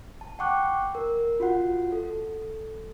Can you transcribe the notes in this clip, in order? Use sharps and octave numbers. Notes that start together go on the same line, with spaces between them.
A5
F#5 G5 C#6 D6 F#6
A#4
F4 F#4 F#5
A4